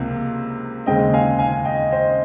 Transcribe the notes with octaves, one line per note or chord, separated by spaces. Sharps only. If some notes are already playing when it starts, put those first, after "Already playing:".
Already playing: C#2 C3 F3 A#3
D#2 C#3 G#3 C4 D#5 G5
F5 G#5
F5 G#5
D#5 G5
C5 D#5